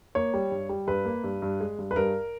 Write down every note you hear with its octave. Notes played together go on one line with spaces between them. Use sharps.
A#3 C#5
G3
G2
G3
G2 B4
A#3
G2
G2
G#3
G2
B4
G2 A#4